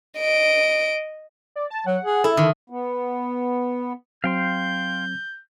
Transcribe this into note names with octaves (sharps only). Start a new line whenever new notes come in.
D#5 D7
D5
A5
F#3 F#5
G#4
E4 A4
D3 D#3
B3
F#3 C4 F5 G5 C6 G6